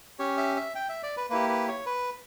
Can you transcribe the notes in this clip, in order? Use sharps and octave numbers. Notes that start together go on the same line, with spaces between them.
C#4 G4 C#5
E5
E5
G5
E5
D5
B4
A#3 E4 G4 B4
B4
C#5
B4